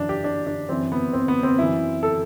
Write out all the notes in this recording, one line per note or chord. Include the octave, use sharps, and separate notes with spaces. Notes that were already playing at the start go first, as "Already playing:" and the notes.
Already playing: F#2 E3 D4
G4
D4
D4
F#2 E3 C4
B3
C4
B3
C4
F#2 E3 E4
A4